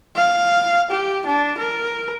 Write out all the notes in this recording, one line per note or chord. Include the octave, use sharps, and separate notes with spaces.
F5
G4
D4
A#4